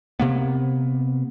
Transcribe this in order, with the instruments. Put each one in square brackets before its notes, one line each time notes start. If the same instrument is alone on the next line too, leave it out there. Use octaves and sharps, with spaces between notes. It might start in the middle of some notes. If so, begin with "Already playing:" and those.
[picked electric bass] C3 A#3 B3